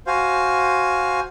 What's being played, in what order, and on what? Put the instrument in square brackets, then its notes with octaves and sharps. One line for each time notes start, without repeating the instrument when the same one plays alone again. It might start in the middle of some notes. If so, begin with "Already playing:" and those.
[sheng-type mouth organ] F#4 C5 F5 G#5